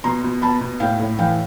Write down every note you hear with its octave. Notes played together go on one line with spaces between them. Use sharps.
B2 A#5 C6
B2
B2 A5 B5
B2
A2 F5 G5
A2
E3 F5 G5